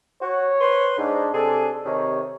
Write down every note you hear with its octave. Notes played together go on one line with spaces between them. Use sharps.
F#4 C#5
B4 C5 C6
G#2 D4
C3 D4 G#4 A4
C3 D#3 C#5